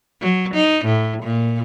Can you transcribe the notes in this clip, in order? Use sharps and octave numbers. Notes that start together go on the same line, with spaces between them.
F#3
D#4
A2
A#2